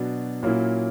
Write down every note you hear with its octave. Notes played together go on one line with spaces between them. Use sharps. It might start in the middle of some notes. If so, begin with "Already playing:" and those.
Already playing: B2 F#3 B3 D4
A#2 F#3 A#3 C#4 E4